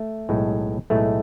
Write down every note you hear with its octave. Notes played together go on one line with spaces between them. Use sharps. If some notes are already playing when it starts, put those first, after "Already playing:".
Already playing: A3
B1 A2 G#3
B1 A2 G#3 A3